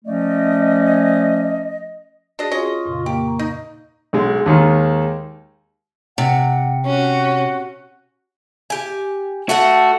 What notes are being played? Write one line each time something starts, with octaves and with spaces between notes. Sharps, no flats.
F3 A3 C#4 D5 D#5
D4 F#4 G#4 D#5
C#4 F4 C#5 D#5 C#6
F2 A#2 C#3
A#3 G4
A#5
D#4
B1 G#3
D#2 D#3 G#3
C3 F#5
C#4 F#4
G4 G#5
A3 F#4 A4 F#5